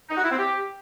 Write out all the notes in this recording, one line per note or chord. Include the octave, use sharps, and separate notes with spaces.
D#4
F#4
E4
C4
G4